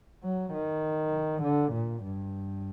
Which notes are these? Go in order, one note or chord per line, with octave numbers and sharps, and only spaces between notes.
F#3
D#3
D3
A#2
G2